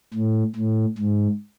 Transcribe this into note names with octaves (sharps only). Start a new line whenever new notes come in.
A2
A2
G#2